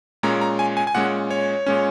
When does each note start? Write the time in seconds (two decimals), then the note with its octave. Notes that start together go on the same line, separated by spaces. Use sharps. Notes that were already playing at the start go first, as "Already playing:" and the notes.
0.23 A#2 G#3 C#4 A#5
0.41 A#5
0.59 G#5
0.77 G#5
0.87 G#5
0.95 A#2 G#3 C#4 F#5
1.31 C#5
1.66 A#2 G#3 C#4